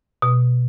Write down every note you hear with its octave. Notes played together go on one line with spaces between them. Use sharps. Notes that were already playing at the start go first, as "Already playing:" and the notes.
B2